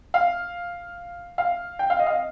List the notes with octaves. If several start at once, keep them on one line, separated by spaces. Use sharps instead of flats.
F5
F5
G5
F5
D#5
F5
D#5